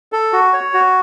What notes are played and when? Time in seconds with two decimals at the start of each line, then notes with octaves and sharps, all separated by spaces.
0.13 A4
0.33 F#4
0.53 C#5
0.74 F#4